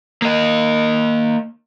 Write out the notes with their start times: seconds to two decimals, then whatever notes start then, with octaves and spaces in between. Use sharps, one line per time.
0.22 A#3 D#5